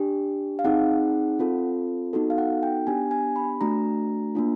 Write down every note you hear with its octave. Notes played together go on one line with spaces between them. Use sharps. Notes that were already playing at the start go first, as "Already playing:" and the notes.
Already playing: D4 G4
F5
C4 D#4 G#4 F#5
C4 F4 A4
B3 D#4 F#4 A4
F5
F#5
G5
B3 D4 G4 G#5
G#5
B5
A3 D4 F#4 A#5
A#3 D4 F4